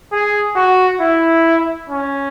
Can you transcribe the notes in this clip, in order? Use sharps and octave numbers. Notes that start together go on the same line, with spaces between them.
G#4
F#4
E4
C#4